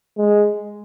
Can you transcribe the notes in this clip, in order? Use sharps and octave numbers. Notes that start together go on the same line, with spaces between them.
G#3